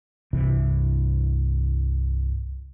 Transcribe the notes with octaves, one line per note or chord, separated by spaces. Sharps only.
C2 G2 C3 E3